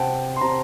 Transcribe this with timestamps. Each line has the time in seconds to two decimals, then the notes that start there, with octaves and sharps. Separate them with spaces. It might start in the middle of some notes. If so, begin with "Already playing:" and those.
Already playing: C3 C4 F#5 G5 A5
0.37 C6
0.41 C3 A#5